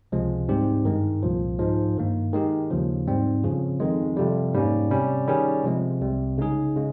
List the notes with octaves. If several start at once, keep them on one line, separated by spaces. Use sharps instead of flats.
C#2 C3 F3 G#3
G#2 G3 C4 G4
G2 D#3 G#3
C2 A#2 F3
G#2 F3 G#3
G2 D#3 A#3
D#3 G#3 D#4 G4
D#2 C#3 F3
G#2 G3 C4
F2 C#3 F3
F2 D#3 G#3
F2 C3 G3
G#2 G3 A#3 C#4
C3 G3 C#4
D#3 G3 C#4 G#4
C3 F3 G#3
C2 C3 G3
C#3 G#3 D#4 G#4
C#3 G#3